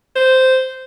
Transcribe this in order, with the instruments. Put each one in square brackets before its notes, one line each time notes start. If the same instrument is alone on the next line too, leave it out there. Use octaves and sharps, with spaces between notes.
[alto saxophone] C5